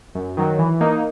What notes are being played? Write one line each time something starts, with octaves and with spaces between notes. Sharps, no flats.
F#2
D#3 F#3
E3
A#3 D#4